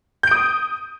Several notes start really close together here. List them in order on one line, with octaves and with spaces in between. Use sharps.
G6 D7 D#6